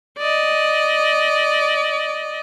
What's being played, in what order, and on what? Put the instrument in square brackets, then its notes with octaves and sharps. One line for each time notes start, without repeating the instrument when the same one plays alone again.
[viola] D5 D#5